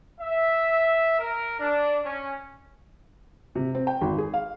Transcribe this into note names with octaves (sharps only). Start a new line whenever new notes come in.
E5
A#4
D4
C#4
C3
C4
G5
G#1
G#4
F5